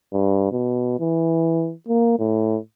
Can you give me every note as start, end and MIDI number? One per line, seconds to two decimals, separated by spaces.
0.13 0.50 43
0.51 0.96 47
1.00 1.73 52
1.88 2.17 58
2.19 2.58 45